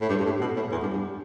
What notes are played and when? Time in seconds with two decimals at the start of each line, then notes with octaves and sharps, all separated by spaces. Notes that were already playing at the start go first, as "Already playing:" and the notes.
0.01 A2
0.09 G2
0.20 G2
0.25 A2
0.41 B2
0.56 A2
0.72 E2
0.82 G2
0.93 G2